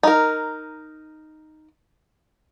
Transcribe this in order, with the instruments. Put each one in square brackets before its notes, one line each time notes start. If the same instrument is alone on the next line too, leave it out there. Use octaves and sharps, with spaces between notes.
[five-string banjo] D#4 A#4